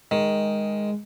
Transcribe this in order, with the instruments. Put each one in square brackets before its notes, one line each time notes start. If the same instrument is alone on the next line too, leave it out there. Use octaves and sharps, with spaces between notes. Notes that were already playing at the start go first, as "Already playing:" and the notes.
[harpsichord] D#3 [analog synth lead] G#3